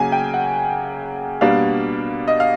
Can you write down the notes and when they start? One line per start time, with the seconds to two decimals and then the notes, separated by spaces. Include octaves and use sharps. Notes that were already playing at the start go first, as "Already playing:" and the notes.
Already playing: C#3 F#3 A#3 G#5
0.12 G5
0.34 F#5
1.41 B2 G3 A#3 D4 F5
2.28 D#5
2.40 F5